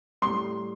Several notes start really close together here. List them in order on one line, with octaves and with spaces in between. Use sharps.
G3 C6 A2